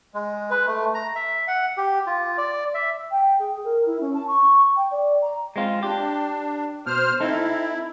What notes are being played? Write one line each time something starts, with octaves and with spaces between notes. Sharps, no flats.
G#3
B4
A3
A#5
E5
F#5
G4
F4
D5
E5
G5
G#4
A#4
E4
C#4
A5
C#6
G5
D5
A#5
G#3 C4 F4
D4 G4
B2 C5 F6
C4 D#4 E4 A4